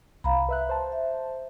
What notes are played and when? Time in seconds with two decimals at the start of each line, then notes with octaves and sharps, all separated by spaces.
0.24 C2 F5 A#5 B5
0.49 B4 E5 F#6
0.69 C5 A5
0.92 E5